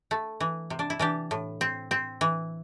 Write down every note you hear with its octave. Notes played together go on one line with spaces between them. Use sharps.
A3
E3
C3
D4
E4
E3 D4 G4
A2
C4
C4
E3